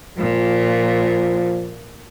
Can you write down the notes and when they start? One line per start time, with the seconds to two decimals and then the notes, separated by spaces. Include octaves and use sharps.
0.18 A#2 F3